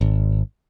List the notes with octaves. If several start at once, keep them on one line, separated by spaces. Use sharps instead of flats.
G#1